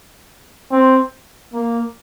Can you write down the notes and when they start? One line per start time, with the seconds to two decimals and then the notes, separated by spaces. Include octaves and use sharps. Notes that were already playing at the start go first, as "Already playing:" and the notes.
0.72 C4
1.54 A#3